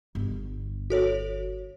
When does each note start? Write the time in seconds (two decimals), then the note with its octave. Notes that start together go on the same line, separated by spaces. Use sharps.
0.15 G1
0.90 F#4 A4 C#5